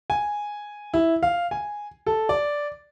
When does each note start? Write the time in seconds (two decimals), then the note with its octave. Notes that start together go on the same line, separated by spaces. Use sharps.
0.10 G#5
0.94 E4
1.23 F5
1.51 G#5
2.06 A4
2.29 D5